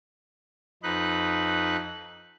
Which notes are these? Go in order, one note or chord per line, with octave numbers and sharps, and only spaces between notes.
F2 D#4 B4 F#6